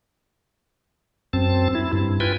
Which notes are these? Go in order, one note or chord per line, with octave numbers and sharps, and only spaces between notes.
F#2 C4 A5
E4
G2
F4 B4 G5 G#5